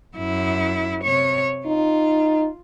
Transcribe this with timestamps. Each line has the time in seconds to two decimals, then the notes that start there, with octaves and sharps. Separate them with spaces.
0.17 F#2 E4
1.03 C3 C#5
1.66 D#4 F4